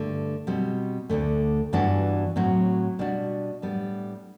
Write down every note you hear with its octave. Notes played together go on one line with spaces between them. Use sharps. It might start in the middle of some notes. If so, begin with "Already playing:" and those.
Already playing: G2 D3 A3
B2 G3 C4
D2 D3 A3
G2 E3 B3 D4 F#4
A2 F#3 C4 F#4
B2 G3 D4 F#4
A2 G3 B3 D4